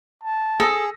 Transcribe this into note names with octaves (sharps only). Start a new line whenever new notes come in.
A5
G#4 A4 D#6 E6 A#6